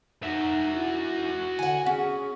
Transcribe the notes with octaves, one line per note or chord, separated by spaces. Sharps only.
D#4 F#4 E5
E4
D3 F#5 G#5
C#4 G#4